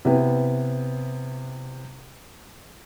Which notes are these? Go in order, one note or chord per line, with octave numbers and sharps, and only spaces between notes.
C3 B3 E4 B4 G5